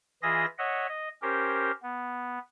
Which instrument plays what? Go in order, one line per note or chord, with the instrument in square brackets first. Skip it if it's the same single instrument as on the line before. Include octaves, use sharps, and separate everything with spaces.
[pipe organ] E3 F4 G#4 D#5 E5 A#6
C#5 D#5 E5 F#5
D#5
C#4 G4 A#4 C5
B3